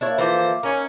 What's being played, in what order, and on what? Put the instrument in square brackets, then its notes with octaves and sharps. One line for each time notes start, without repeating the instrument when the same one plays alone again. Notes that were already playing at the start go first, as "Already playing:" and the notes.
[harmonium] A#3 [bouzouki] D4 E4 C#5
[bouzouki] E3 [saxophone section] F3 A4 C5 [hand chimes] F5 D6
[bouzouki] A#3 D#4 [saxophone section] C#4